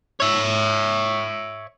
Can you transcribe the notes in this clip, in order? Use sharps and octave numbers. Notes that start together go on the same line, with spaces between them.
C#5 E5